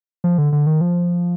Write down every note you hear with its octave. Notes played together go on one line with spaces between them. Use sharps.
F3
D3
D3
D#3
F3